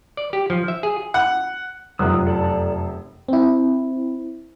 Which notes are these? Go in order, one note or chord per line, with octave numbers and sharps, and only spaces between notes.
D5
G4
F3
E5
G#4
F#5
F1 F#2 F3 D#6 E6 F#6
A4 D5 A5
C4 E4